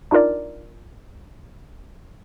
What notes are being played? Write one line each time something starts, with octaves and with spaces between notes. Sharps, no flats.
D4 D#4 F4 A#4 D5